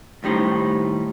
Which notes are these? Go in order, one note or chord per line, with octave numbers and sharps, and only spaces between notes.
D#2 A2 G3 D#4 C5